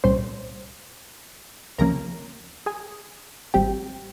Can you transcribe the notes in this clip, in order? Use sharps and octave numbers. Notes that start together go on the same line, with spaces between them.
C2 A#2 G3 C#4 C5 C6
C#2 C3 F3 A#3 C#4 A#4 A#5
G#4 G#5
G#1 G#2 G3 C4 G4 G5